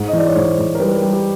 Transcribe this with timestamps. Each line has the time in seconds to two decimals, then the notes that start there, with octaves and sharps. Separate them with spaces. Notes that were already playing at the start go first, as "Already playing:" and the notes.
Already playing: G#2
0.08 D#5
0.13 E3 D5
0.26 C#5
0.35 G#2 C5
0.58 G#2
0.75 A#4
0.79 G3 B4
0.91 A#4
1.02 G3 G4
1.13 G4